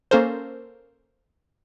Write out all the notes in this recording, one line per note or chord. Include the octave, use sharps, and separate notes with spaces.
A#3 C#4 A4 A#4 C5